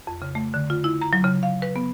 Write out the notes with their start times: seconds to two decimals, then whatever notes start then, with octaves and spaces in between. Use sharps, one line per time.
0.07 F2
0.22 C#3
0.35 A3
0.54 D3
0.70 F4
0.84 E4
1.01 A#5
1.13 F#3
1.24 C#3
1.43 F5
1.62 B4
1.76 B3